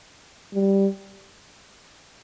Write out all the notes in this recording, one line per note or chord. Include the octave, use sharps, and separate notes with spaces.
G3